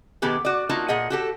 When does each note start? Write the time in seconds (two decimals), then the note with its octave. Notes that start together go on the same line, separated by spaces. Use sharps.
0.22 B2 D#3 B3 G4 G#4
0.45 F#4 D5
0.69 A#3 D#4 F4 F#4 A5
0.88 A#2 G#4 D#5 F#5
1.10 F#4 G4 A4